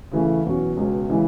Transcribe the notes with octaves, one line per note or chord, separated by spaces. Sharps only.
C#3 E3 A3 C#4 G#4
E2 B2 F#3 C#4 F#4
C#2 B2 G#3 C#4
C#3 E3 G#3